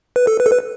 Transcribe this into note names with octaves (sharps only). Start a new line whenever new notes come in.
B4
A4
B4
A4
B4